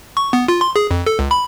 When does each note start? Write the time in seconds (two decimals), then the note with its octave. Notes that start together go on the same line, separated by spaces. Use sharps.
0.17 C#6
0.33 B3
0.48 F4
0.61 C6
0.76 G#4
0.91 F2
1.07 A4
1.19 C#2
1.31 B5